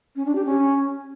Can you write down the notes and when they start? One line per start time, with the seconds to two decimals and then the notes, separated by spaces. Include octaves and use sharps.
0.16 C#4
0.26 D4
0.35 G4
0.45 C#4